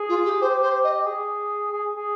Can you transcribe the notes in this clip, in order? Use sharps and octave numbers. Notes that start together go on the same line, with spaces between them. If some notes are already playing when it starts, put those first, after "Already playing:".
Already playing: G#4
F4
G4
G4 C5
C5
D#5
G#4
G#4
G#4